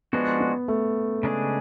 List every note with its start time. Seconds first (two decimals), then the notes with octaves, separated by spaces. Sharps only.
0.13 F3 G#3 B3 D4 F#4
0.41 B3
0.68 A3
1.23 C#3 G#3 D4 G#4